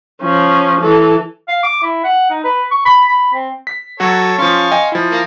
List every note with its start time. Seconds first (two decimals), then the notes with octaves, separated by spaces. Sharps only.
0.22 F3 C#4
0.80 E3 A4
1.48 F5
1.63 D6
1.83 E4
2.04 F#5
2.30 D#4
2.44 B4
2.71 C#6
2.86 B5
3.08 B5
3.34 C4
3.67 B6
4.00 F#3 F#4 A4 C#5
4.38 F3 C#4 F5 C6 C#6
4.72 D#5 G5 G#5
4.92 F3 E4
5.11 A#3